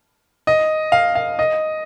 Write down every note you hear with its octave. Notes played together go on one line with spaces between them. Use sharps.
D#5
F5
F5
D#5